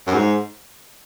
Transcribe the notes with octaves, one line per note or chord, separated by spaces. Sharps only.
F#2
G#2